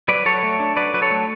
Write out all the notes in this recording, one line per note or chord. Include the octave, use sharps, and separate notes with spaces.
F#3 B4 D5
F#3 A4 C#5
A3
D4
F#3 B4 D5
F#3 B4
A4 C#5
A3